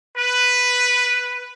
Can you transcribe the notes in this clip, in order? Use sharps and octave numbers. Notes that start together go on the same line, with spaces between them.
B4